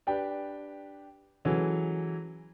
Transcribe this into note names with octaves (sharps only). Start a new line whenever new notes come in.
D4 G4 B4 G5
E3 F#3 G#3 C#4 A4